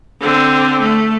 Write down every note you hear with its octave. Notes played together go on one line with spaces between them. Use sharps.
D3 C4
A3